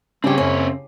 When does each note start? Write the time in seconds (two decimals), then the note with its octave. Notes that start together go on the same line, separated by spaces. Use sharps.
0.24 C#3 G3 C4 D4 G4 C#5
0.38 F#2 C#4